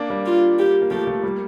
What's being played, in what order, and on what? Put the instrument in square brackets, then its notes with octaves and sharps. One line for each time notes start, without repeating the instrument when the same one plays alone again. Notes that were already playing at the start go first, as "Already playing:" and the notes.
Already playing: [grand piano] A#3 D4
G3 A#3
[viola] F4
G4
[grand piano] A#3
[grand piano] F3 A3 [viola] G4
[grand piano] F3 A3
G3 A#3